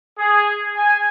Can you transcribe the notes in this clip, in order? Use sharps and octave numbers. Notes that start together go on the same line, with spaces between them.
G#4
G#5